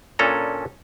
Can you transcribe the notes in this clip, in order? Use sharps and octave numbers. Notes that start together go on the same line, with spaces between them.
A#2 C#4 D4 A4 G#5 A#5